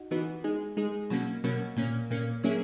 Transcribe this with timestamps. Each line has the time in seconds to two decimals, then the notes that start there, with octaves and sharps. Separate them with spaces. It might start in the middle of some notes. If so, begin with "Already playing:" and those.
Already playing: D#4 F#4
0.11 E3 B3 D#4 F#4
0.44 G#3 D#4 G#4
0.77 G#3 D#4 G#4
1.10 B2 F#3 A#3 C#4
1.44 B2 F#3 A#3 C#4
1.76 A#2 A#3 C#4
2.11 A#2 A#3 C#4
2.44 F#3 A#3 C#4 E4 G#4